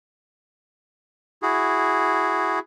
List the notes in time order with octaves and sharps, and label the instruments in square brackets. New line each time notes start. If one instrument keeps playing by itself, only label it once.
[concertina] E4 F#4 G#4